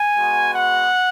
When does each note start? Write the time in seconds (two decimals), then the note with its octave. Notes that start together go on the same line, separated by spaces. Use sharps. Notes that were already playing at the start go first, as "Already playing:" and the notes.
Already playing: G#5
0.15 G#3 B3 F#4
0.54 F#5